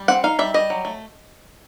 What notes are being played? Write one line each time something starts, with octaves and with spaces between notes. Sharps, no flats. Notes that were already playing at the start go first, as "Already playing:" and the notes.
Already playing: G3
C4 F#5
D#4 F5
G3 E5
G3 D#5
F#3
A3